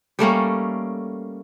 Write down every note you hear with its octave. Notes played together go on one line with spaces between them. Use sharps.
G3 A3 A#3 C#4